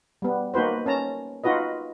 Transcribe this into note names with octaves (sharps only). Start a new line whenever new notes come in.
G3 B3
A#3 D#4 F#4 B4 C5
C#4 A5 A#5
D#4 F4 F#4 B4 D#5